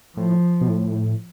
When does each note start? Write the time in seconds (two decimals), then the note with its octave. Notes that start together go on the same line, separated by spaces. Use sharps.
0.16 A2 F3
0.61 B2
0.68 A2